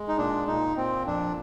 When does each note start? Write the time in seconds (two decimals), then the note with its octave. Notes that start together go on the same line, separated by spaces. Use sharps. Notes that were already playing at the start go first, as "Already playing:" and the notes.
Already playing: G#3
0.08 D#4
0.17 A#2 D4
0.47 A#2 D#4
0.76 A#2 C4
1.06 F2 D4